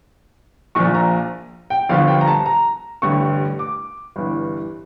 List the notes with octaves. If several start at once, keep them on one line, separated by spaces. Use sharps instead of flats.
A#1 A#2 F3 C#6
A#5
G5
G1 G2 D3 F3 F5
G5
A#5
A5
A#5
A1 G2 D3 C#6
D6
G1 G2 E3